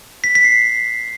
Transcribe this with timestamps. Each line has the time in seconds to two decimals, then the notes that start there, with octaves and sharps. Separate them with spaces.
0.24 B6
0.35 B6
0.44 C7